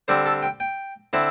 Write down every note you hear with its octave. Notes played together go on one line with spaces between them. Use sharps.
D3 G3 C4 C5
A4
G5
G5
D3 C4 E4